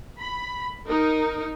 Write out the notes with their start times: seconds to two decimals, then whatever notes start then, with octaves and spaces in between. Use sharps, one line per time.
0.18 B5
0.88 D#4 A#4